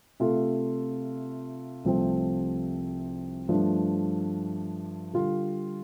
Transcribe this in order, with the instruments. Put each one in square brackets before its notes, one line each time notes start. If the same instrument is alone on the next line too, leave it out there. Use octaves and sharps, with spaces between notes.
[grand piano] C3 A3 F4 A4
C2 C3 F3 A3 C4
G2 F3 A3 D4
D3 G3 F4